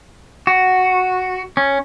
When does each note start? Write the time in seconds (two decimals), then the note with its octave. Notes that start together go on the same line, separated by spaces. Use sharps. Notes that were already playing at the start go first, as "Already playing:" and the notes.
0.47 F#4
1.57 C#4